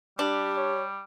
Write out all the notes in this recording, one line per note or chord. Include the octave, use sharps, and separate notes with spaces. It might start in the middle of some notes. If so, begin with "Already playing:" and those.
G3 D4 G4
C#5